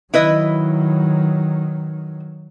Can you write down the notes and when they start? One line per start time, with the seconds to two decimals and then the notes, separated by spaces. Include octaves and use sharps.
0.14 D#3 F#3 E4 B4 D#5